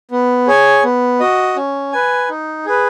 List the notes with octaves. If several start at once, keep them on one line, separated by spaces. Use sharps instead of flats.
B3
G#4 C#5 G#5
B3
F#4 D#5
C#4
B4 G#5
D#4
G#4 B4